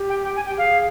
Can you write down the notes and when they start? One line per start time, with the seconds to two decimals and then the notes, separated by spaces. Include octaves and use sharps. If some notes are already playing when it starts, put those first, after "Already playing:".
Already playing: G4
0.10 G5
0.25 G5
0.36 G#5
0.47 G5
0.50 G4
0.57 G#4 F5